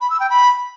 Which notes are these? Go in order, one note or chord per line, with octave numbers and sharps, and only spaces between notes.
B5
E6
G5
B5